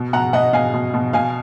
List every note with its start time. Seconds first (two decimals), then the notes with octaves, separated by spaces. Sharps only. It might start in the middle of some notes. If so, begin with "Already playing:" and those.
Already playing: B2
0.13 B2 F#5 A#5
0.33 B2 D#5 F#5
0.53 B2 F5 G#5
0.74 B2
0.94 B2
1.13 B2 F5 G#5